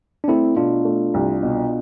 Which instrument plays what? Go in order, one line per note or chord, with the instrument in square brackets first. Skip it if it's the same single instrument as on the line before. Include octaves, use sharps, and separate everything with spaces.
[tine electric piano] D4
[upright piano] A3 [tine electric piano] C4 E4
[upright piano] B2 [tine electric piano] D4 F4
[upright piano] A3
C2
B2